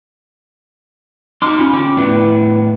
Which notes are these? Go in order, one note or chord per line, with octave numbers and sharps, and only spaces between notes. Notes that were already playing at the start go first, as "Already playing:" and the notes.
D#4 F#4 C6 D6 F6
C#4 F4 B5
D3 C#4 G5 D6
A2 B3 D4 E4 B4